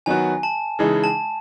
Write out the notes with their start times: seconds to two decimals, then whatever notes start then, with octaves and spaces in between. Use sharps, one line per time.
0.06 D#3 F#3 B3 F#4 G#5
0.43 A5
0.79 C#3 E3 G#3 D#4 G#4
1.04 A5